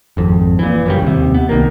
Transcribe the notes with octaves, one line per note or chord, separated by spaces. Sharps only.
G#1 F2
A#2 E3
F#2 C#3 G3
D#2 C3
B3
C2 D#3 A#3